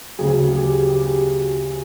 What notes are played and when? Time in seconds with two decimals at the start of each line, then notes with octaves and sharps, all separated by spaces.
0.18 D2 C#3 F#3 G#4
0.48 G#4
0.55 G4
0.87 G4